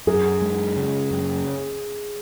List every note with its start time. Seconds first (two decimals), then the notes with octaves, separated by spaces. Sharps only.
0.07 F#2 G#4
0.42 G#3
0.76 C#3
1.11 F#2